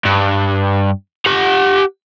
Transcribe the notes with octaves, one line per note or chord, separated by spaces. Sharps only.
G2
G4 F#5